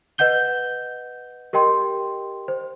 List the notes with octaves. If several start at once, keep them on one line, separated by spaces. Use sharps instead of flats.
B4 D#5 F#5 G6 G7
G4 A#4 D#5 G5 C6
C5